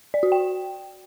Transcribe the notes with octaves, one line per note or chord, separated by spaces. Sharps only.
D5
F#4
G5